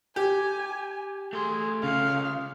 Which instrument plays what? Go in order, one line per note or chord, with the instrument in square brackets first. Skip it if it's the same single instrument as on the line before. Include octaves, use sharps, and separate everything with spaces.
[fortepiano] G4 [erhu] G#5
[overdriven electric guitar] A3 C6 [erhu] G#4
[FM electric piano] C#3 [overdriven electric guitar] C#4 F4 [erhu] F5